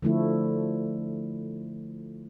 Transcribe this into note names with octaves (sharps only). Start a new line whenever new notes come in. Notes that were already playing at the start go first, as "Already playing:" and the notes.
D3 F3 A3 E4